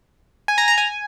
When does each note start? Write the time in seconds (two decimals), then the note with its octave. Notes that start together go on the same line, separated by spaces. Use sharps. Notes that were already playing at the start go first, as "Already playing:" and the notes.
0.48 G#5
0.58 A#5
0.68 A#5
0.78 G#5